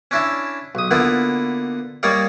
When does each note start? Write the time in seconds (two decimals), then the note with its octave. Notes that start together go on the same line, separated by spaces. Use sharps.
0.11 C#4 D4 E4 E5
0.75 B1 D#6
0.91 D3 A#3 B3 E4 F4
2.03 G3 A#3 D#4 C#5 D5 F5